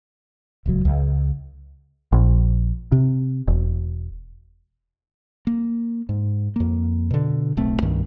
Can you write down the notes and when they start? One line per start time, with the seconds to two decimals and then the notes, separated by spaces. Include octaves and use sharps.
0.66 D1 C#2 F#3
0.85 C#2
2.12 A#1
2.92 C3
3.48 E1
5.47 A#3
6.09 G#2
6.56 F2 A#3
7.11 B2 D3
7.57 D1 B1 A3 C4
7.82 C2 G2 D#3